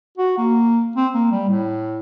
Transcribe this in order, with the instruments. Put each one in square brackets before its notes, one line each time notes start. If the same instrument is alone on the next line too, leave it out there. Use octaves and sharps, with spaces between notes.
[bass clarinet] F#4
A#3
C4
A#3
G3
A2